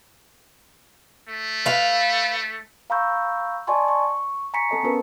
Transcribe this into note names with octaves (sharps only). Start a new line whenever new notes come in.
A3
B4 F5
F5 A#5 B5 C#6 E6 G6
D5 D#5 G#5 A5 C6 C#6
C#6
G#5 A#5 C#6 B6 C#7
C4 A4 D#5 A5
B3 C#4 A#4 B4